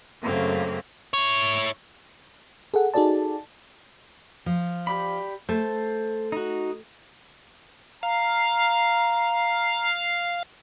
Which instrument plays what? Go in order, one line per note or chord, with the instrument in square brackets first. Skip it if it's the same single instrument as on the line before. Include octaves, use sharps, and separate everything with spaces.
[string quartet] F#2 C#3 A3 A#3 C4
[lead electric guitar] E4 C#5
[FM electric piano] G#4 A4 F#5
D#4 F#4 G#4 A4 D5 A5
[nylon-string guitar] F3
[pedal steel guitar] G4 D5 B5
[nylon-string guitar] A3 [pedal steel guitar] C5 A5
[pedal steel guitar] D#4 F#4
[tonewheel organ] F5 [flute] A#5